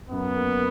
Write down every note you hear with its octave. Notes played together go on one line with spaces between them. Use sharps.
F#2 B3
A#3